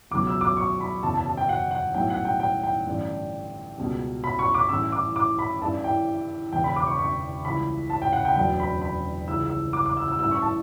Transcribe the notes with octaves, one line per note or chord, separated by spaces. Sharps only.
C#2 B2 F#3 D6
E6
D6
C#6
B5
F#1 E2 B2 A5
A5
A5
G5
F#5
F#5
B1 A2 G3 G5
F#5
G5
G5
G5
A1 G2 D3
C#2 B2 G3
B5
C#6
D6
A1 A2 E3 G3 E6
D6
D6
B5
A1 G2 E3 G3 A5
G5
E1 E2 C#3 G5
B5
D6
C#6
C#6
C#2 C#3 E3 G3 B5
A5
G5
F#5
G5
E1 D2 D3 F#3 G5
B5
B5
C#2 C#3 E3 G3 E6
E6
D6
D6
E6
E6
A1 G2 E3 G3 E6
C#6
A5